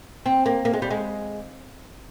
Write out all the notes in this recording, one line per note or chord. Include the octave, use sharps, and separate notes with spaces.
C4
A#3
A#3
G#3
G3
G#3